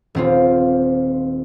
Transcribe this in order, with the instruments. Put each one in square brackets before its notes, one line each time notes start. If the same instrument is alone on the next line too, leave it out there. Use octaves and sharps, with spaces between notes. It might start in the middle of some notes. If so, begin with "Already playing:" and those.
[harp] D#1 C4 F4